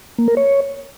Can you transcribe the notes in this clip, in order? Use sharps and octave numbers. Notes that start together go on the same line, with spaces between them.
A#3
A#4
C#5